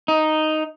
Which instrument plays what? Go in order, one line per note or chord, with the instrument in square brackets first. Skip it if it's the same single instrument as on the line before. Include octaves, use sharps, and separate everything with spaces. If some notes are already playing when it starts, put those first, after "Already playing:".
[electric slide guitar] D#4